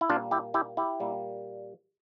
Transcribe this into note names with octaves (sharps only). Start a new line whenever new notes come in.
E4
A#2 G3 A#3 D4 F4
E4 G4
E4 G4
E4 G4
A#2 G3 A#3